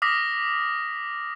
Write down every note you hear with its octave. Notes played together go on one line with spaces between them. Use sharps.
D6 D#6 F6 A#6 B6